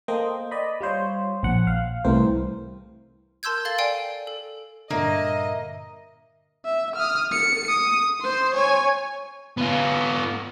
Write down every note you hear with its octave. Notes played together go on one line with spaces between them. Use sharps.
A#3 A4 C5 D#5 G5
D5 D#5 B5
G3 F4 C5 C#5
A#1 F#5
F5
C2 A2 E3 C4 A#4 C5
A#4 A5 C6 E6 G6 G#6
A4 F5 A6 G7
D5 G5 G#5 C7 D7
A4
G2 A#2 D3 A#3 D#5 E5
E5
D#6 F6
C#7
D#6
C5 C6
C#5 G#5
B3 F4